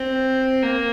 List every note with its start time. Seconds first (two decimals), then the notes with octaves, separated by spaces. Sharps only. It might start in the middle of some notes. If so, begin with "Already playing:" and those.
Already playing: C4
0.62 A#3